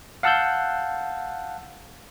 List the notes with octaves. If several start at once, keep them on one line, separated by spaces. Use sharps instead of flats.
F5 F#5 A5 E6 F#6 G6